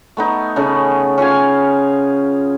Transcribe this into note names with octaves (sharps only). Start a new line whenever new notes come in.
A3 B3 D#4
C#3 A3 C#4
C#4 F4 F5 G#5